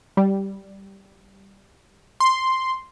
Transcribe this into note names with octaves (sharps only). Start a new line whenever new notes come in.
G3
C6